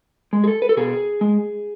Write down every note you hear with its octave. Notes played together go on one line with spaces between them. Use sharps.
G#3
G#4
A4
B4
A4
B2 G#4
G#3